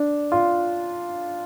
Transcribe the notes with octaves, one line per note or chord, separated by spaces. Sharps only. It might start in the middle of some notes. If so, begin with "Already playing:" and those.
Already playing: D4
F4